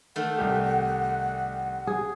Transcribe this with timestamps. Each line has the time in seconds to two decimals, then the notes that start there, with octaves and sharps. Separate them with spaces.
0.16 D#3 A3 F#5
0.38 C2 G4
1.87 G#4